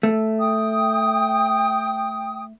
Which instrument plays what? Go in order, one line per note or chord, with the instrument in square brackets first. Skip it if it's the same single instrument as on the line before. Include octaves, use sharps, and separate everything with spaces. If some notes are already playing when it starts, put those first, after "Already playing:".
[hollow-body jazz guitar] A3
[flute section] G5 D#6